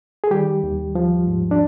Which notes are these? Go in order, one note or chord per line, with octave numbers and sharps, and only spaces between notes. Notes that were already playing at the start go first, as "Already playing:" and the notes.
G#4
D#3 G3 G4
D#2
F3
G#2
D4